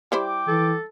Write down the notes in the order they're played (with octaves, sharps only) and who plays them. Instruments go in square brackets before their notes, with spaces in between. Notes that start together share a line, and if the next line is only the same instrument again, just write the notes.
[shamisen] G3 E4 C5 [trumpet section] G5 D6
[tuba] E3 [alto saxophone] A4